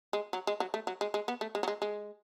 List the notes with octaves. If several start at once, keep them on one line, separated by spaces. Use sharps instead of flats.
G#3
F#3
G#3
F#3
A3
F#3
G#3
G#3
B3
A3
G#3
F#3
G#3
G#3